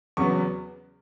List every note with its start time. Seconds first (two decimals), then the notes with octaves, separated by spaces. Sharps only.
0.17 E2 C#3 F#3 B3 C#6